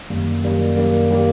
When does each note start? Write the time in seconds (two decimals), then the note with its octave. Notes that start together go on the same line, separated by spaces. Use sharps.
0.10 F#2 D#3 G3 A#3
0.43 F#2 D#3 G3 A#3
0.77 F#2 D#3 G3 A#3
1.11 D#3 G3 A#3